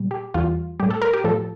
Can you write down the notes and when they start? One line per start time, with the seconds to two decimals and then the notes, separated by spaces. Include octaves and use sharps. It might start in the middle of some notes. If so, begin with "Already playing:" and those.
Already playing: A#2 G3
0.11 G4
0.34 E2 E3 G3 F4
0.80 A2 G3 G4
0.90 A4
1.02 A#4
1.13 G4
1.24 A2 F3 A4